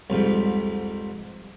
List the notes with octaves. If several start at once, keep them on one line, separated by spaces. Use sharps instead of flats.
C2 F2 G#2